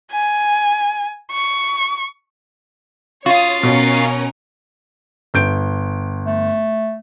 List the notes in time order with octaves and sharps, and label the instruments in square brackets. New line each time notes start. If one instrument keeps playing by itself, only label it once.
[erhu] G#5
C#6
[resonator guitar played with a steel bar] F4 [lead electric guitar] F#4 F5 [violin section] C#5 D#6
[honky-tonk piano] B2 [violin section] C#4 A#4
[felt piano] G1 G6 D7
[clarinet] A3